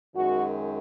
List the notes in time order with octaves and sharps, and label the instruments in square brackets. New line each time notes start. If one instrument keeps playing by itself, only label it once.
[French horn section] F#2 D#3 G#3 F#4